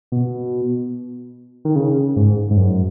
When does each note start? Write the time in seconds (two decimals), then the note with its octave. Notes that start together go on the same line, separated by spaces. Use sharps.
0.12 B2
1.65 D#3
1.76 C#3
2.16 G#2
2.51 G#2
2.57 F#2